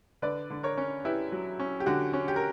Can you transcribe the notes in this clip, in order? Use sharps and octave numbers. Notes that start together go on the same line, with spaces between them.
D3 B4 D5
D3
A#4 C#5
C#4
E4 G4 B4
F#3
C#4
G4
D3 F#4
C#4
G4
A#4